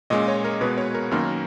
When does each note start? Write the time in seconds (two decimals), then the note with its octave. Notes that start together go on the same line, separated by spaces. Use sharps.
0.10 A#2 G#3 C#4 D#5
0.28 C#5
0.44 A#4
0.61 B2 G#3 B3 B4
0.78 C#5
0.94 A#4
1.11 F#2 D#3 A#3 A#4